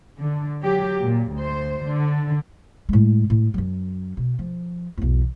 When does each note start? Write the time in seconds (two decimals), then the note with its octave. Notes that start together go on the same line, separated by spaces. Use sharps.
0.20 D3
0.62 F#3 G4
1.03 A#2
1.34 D2 C5
1.87 D3
2.89 A2 G#3
3.30 A2
3.54 F#2 F#3
4.17 B2
4.39 F3
4.98 B1 E2